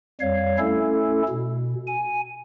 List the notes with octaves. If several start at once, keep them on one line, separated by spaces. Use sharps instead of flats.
F2 G3 C#5 F5
A3 C#4 E4 A4
B2
G#5